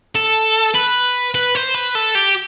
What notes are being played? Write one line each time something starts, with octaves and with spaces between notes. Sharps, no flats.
A4
B4
B4
C5
B4
A4
G4